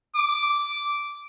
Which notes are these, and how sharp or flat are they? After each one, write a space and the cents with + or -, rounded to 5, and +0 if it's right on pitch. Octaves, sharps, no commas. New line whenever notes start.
D6 -5